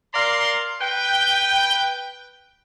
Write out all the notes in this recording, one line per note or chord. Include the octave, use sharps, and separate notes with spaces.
A#4 D5 F5 A#5 C6
B4 G5